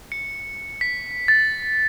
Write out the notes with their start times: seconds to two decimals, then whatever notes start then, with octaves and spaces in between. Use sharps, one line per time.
0.12 C#7
0.81 B6
1.28 A6